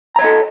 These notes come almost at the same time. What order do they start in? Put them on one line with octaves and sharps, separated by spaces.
A#5 C#5 D#5 A4